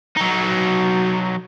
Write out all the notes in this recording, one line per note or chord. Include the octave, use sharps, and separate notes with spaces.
F#3 D#4